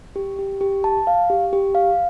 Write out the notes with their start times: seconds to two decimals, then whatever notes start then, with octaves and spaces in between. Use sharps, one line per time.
0.16 G4
0.39 G4
0.61 G4
0.84 A5
1.07 F5
1.30 G4
1.53 G4
1.75 F5